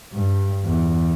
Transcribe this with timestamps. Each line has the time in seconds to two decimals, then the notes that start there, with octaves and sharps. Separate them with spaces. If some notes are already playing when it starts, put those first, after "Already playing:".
0.13 G2
0.65 E2